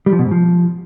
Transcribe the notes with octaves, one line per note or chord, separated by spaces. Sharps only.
G3
F3
B2
G#2
F3